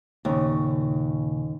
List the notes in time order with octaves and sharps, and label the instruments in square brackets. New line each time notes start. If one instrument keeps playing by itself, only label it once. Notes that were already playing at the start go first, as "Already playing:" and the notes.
[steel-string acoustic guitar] D#2 [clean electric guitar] A#2 C#3